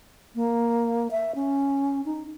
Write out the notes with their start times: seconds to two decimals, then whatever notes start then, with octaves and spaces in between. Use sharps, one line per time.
0.35 A#3
1.11 E5
1.35 C#4
2.05 D#4